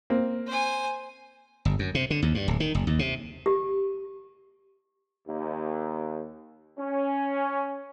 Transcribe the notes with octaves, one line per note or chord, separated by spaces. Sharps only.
A#3 C4
C5 G#5
G1
F#2
C3
D3
D#2
G2
D1
D#3
F#1
D#2
C3
G4
D#2
C#4